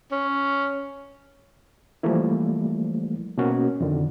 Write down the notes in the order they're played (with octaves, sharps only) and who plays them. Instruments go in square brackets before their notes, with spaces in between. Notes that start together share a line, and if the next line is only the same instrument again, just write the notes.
[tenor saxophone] C#4
[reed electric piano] E3 F3 G3 A3 A#3 E4
B2 A#3 C#4 F#4 A#4
F2 D3 D#3